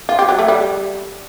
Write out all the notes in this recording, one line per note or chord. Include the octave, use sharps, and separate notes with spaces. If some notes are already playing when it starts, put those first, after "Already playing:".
F4
G4
F#3
A3
G3